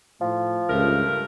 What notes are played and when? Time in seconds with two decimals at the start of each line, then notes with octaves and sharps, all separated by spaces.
0.21 A2 F3
0.69 C#2 G2 A3 A#4